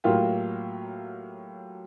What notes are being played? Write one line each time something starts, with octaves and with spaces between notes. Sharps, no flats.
A2 F#3 A#3 F4 G4